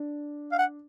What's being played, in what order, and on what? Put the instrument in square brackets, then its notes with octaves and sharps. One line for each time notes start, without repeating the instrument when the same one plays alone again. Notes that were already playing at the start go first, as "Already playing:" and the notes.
Already playing: [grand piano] D4
[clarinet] F5
F#5